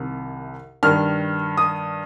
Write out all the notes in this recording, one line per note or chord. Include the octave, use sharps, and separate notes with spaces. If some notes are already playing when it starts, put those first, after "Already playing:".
Already playing: C2 C3 D#3
G2 D#3 F6
D#6